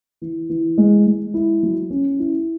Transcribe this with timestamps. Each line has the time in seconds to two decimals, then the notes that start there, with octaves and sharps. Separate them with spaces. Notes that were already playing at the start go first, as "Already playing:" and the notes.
0.22 E3
0.49 E3
0.78 G#3
1.06 G#3
1.34 E4
1.63 F#3
1.90 C#4
2.19 E4